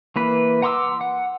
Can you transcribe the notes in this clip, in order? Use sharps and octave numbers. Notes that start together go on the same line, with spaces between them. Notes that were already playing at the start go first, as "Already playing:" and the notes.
E3 A#3 B4
F#5 A#5 C6 D6 E6
F#5